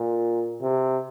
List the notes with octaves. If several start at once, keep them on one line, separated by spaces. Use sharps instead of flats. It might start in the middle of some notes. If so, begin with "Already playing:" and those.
Already playing: A#2
C3